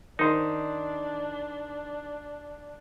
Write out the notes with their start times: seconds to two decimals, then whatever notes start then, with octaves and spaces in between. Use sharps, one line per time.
0.19 D#3 D4 D#4 C5